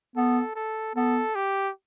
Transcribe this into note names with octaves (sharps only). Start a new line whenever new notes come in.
B3 A4
A4
B3 A4
G4